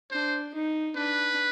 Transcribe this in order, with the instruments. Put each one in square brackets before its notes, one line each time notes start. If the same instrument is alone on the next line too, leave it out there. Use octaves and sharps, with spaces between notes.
[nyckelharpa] D4 [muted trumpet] C5
[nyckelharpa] D#4
[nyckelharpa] D4 [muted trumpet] B4